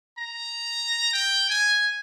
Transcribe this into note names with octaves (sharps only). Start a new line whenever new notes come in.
A#5
G5
G#5